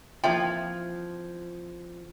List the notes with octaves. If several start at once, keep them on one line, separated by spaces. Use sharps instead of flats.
E3 F3 A#3 C4 E5 G5 G#6